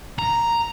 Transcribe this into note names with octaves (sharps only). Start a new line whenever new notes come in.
A#5